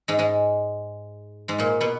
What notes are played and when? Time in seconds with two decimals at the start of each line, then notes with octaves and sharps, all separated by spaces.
0.08 G#2 G#3
0.19 G#2 G#3
1.48 G#2 G#3
1.58 A#2 A#3
1.81 B2 B3